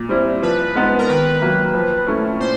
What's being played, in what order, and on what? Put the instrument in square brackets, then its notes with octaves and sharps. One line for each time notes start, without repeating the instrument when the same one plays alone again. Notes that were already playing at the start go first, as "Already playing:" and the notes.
Already playing: [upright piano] A#2
G3 C4 E4
[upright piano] F3 [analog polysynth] B4
[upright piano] G#3 B3 D#4
[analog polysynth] A#4
[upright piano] D#3 [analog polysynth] B4
[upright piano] F#3 A#3
F3
A3 C#4 E4
[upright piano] A#2 [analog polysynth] C5